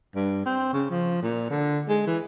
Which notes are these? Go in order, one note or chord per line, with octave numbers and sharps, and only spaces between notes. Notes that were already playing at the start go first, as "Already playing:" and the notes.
G2
C4
C#3
F3
A#2
D3
G#3
E3